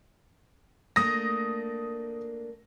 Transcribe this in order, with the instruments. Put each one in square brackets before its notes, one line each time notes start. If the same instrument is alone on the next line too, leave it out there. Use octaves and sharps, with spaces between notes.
[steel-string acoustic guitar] A3 A#3 D4 [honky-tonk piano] D#6 A#6